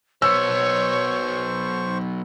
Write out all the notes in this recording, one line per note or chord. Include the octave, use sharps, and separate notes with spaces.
F#3 B3 C5 C#5 C#6 E6